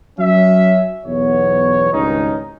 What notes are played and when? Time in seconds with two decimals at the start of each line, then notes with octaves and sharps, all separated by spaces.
0.19 F#3 C#4 E5
1.05 B1 E2 B3 C#5
1.92 G#1 C#2 G2 C#4 D#4